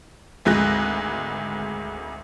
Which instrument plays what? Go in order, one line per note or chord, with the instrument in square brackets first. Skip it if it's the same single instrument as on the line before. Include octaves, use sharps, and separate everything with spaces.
[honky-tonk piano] G#1 D2 G#3 F#6 A#6